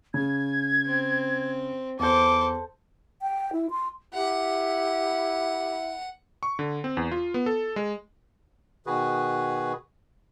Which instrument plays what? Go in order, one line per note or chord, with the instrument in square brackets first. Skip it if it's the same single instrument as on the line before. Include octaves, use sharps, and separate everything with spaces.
[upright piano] C#3 [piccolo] G#6
[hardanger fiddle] C4
[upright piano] E2 G6 [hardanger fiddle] A4 C5 [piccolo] D6
[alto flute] G5
E4
C6
[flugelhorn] E4 [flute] G4 [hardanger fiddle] F#5
[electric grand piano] C#6
D3
C4
E2
F4
B3
A4
G#3
[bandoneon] B2 D#3 F#4 G#4 B4